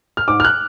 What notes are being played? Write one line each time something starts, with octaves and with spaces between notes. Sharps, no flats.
F6
G#2 D6
F6
F#6